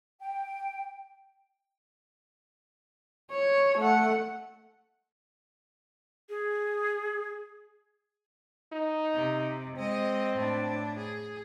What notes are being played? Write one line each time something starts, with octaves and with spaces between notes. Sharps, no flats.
G5
C#5
A3 F#5
G#4
D#4
C3
G#3 C4 D#5
A2 D4
G#4